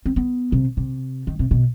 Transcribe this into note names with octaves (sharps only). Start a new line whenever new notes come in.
C4
B3
C3
C3
D#3
C3
B2